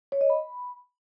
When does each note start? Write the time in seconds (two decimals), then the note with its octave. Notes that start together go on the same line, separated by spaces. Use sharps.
0.12 C#5
0.21 D#5
0.30 B5